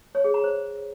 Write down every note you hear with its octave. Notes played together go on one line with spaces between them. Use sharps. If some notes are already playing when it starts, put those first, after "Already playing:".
C#5
G#4
A#5
C5